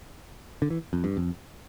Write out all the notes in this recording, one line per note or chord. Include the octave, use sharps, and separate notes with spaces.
D3
E3
F2
G2
F2